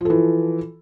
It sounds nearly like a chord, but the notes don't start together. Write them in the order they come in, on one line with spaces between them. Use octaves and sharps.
F3 A4 E3